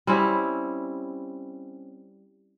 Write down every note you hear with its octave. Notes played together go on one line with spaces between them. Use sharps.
G3 C4 C#4 E4